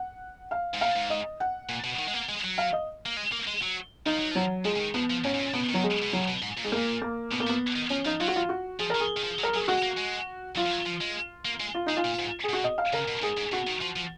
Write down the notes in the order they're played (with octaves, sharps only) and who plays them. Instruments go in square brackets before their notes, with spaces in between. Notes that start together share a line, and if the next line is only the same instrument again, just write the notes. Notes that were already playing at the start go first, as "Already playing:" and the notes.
Already playing: [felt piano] F#5
F5
[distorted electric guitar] G#2
[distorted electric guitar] A#2 [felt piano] F5
[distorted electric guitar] G#2
[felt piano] D#5
F#5
[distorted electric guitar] A#2
B2
D#3
G#3
A#3
G#3
F#3
[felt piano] F5
D#5
[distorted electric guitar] A#3
G#3
A#3
G#3
F#3
[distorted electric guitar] F3 [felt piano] D#4
[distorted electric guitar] F#3
[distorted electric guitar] F3 [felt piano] F#3
[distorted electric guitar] F3 [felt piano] G#3
[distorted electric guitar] C#3
D#3
[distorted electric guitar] F3 [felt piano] B3
[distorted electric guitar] F3
[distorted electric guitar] G#2 [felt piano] C#4
[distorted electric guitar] G#2
A#2
[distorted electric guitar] B2 [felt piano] B3
[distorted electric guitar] D#3 [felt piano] F#3
[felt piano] G#3
[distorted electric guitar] B2
[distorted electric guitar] C#3 [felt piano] F#3
[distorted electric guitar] B2
G#2
A#2
[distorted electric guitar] G#2 [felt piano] G#3
[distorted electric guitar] A#2 [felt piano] A#3
[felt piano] A#3
[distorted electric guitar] B2 [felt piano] B3
[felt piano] A#3
[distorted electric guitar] F3
[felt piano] B3
[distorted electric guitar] D#3
[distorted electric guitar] F3 [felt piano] C#4
[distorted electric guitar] F3 [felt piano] D#4
[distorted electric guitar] F#3 [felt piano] F4
[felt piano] F#4
F4
F#4
[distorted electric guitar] F3 [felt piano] G#4
[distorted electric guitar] D#3 [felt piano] A#4
[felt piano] G#4
[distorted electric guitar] D#3
F3
F#3
[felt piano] A#4
[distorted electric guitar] F#3 [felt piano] G#4
[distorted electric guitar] G#3 [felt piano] F#4
[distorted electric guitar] A#3
G#3
[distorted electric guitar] F#3 [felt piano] F4
[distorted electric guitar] F3
F#3
F3
G#3
A#3
G#3
[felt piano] F4
[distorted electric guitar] G#3 [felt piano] D#4
[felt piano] F4
[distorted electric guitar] A#2
G#2
[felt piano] G#4
[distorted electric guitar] B2 [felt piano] F#4
[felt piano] D#5
F5
[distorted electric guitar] C#3 [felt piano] A#4
[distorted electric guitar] B2
[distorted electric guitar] G#2 [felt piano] G#4
[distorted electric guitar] G#2
[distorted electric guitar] B2 [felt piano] F#4
[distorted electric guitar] D#3
F3
F3